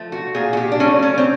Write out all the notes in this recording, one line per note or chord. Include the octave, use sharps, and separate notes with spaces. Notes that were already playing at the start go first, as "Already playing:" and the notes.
Already playing: F3 A3
F#4
A#2 G#4
F#4
G4
D4
F#3 A3 C#4
C#4
C4